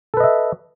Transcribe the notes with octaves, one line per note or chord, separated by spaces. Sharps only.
A4 B4 D#5 E5